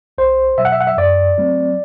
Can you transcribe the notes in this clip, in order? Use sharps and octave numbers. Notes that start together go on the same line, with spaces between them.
C2 C5
B2 F#3 E5
F#5
E5
F#5
E5
F#2 D5
F#3 A3 C4